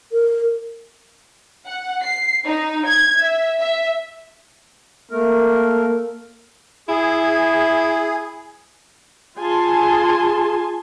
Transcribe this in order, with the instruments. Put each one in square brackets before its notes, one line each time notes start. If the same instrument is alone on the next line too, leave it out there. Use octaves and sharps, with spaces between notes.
[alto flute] A#4
[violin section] F#5
C7
D#4
G#6
E5
E5
[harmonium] A3 A#4 [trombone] A#3
[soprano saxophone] E4 [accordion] G#4
[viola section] F4 G#4 G#5 A5 C6